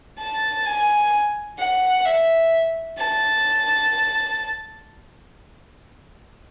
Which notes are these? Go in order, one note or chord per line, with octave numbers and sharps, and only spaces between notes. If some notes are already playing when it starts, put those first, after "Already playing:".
A5
G#5
F#5
E5
A5